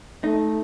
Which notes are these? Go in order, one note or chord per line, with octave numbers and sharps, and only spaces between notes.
A3 D#4